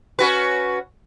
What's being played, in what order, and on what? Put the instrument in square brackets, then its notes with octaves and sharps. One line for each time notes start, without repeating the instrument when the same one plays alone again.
[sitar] C#4 F#4 B4